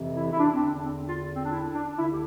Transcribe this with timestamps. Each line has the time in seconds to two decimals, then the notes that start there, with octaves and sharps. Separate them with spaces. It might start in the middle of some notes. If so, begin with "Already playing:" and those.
Already playing: F2 C3 E3
0.16 E4
0.32 E4
0.39 D4
0.53 C4
0.61 E2 D3 D4
0.84 C4
1.06 F4
1.35 C4
1.44 D4
1.51 E4
1.74 D4
1.97 D2 E4
2.01 D3
2.11 G4